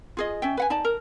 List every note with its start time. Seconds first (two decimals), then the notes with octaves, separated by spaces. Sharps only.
0.17 F4 G#4 D#5
0.42 C#4 E5 G5
0.57 B4 F#5 G#5
0.70 D#4 D5 A5
0.85 A#4